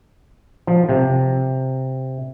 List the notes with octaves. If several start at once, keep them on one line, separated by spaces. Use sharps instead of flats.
F3
C3